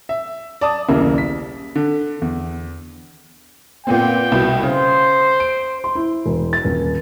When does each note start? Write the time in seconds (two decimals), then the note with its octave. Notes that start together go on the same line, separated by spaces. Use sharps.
0.09 E5
0.61 D5 A5 D#6
0.88 D#1 B1 C#3 A#3 E4
1.18 B6
1.75 D3
2.22 E2
3.87 A#2 B3 C4 G5
4.32 C2 B2
4.63 C#3 C5
5.40 D7
5.84 C6
5.95 E4
6.26 E1
6.53 A6
6.64 D#1